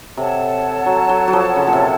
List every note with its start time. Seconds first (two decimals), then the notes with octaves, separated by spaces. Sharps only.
0.17 C3 A4 C#5 F#5 A5
0.86 F#3
1.09 F#3
1.28 F#3
1.33 F3
1.56 C#3
1.67 A#2
1.73 C3